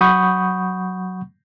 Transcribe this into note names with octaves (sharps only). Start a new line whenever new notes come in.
F#3 F#5 B5 C#6 D#6 G6